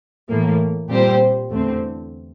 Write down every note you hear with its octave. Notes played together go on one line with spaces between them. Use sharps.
A2 E3 A#3
A#2 G3 C4 G4 C5
E2 D3 A3 C4